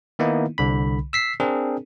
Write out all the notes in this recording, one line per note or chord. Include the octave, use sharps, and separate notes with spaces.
D#3 A#3 B3 D#4 E4
C2 D3 B5
E6 B6 C7
C4 D4 G#4 A#4